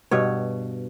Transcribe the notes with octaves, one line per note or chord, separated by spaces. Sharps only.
G2 B2 C#5